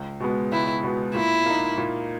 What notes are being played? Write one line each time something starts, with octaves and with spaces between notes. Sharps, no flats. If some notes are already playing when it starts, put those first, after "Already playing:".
Already playing: C#2
B2 G#3 B3
C#2 E4
B2 G#3 B3
A#2 E4
A#3 D#4
A#2